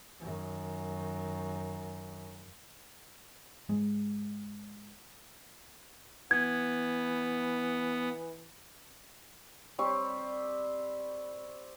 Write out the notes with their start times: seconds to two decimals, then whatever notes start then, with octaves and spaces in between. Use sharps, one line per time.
0.20 F#2 D#3
3.69 G#2 G#3
6.31 E3 B3 G#6
9.79 G3 C4 B5 C#6